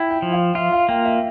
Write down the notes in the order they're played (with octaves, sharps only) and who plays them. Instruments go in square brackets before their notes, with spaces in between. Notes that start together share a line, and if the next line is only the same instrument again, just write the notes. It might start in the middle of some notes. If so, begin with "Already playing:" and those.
Already playing: [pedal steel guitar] E4 [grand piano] G5
[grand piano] G5
[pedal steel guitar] F3
[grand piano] F5
[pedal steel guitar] F4 [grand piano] E5
[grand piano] F5
[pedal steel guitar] A#3 [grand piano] G5
[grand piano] E5